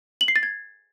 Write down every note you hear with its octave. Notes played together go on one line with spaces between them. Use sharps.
F#7
C7
A6
G#6